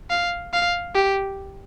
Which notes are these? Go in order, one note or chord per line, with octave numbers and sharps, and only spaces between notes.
F5
F5
G4